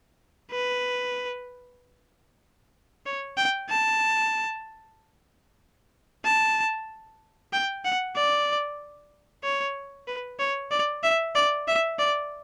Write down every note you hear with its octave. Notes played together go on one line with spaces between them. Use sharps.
B4
C#5
G5
A5
A5
G5
F#5
D5
C#5
B4
C#5
D5
E5
D5
E5
D5